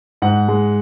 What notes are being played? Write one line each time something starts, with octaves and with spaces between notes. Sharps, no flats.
G#2 F#5
G#3